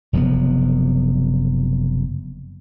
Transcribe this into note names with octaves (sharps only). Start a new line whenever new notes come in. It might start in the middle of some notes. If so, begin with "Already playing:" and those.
F#1 C3 F3 B3